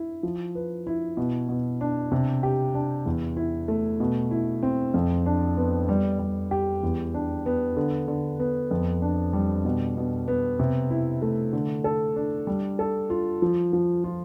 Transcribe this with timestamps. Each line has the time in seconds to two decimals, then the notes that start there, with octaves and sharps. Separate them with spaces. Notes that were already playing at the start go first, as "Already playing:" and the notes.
Already playing: E4
0.23 F3
0.55 B4
0.87 E4
1.17 B2
1.49 B2
1.81 D4
2.12 C3
2.43 G4
2.74 D4
3.06 E2
3.37 E4
3.68 A3
4.00 B2
4.31 E4
4.63 C4
4.94 F2
5.26 D4
5.57 B3
5.89 G3
6.19 G3
6.51 G4
6.83 E2
7.14 D4
7.46 B3
7.77 D3
8.08 D3
8.39 B3
8.71 F2
9.02 D4
9.33 G3
9.65 B2
9.97 B2
10.28 B3
10.59 C3
10.90 E4
11.22 A3
11.53 D3
11.84 A4
12.16 D4
12.47 G3
12.79 A4
13.10 F4
13.42 F3
13.73 F3
14.04 F4